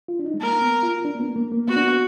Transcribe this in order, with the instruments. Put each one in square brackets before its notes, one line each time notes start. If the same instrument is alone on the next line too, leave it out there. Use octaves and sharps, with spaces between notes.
[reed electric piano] F4
D4
D#4
G#3
[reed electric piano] A#3 [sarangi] A#4
[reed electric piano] B3
F4
D4
A#3
B3
A#3
A#3
[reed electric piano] B3 [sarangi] F#4
[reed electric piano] D4
B3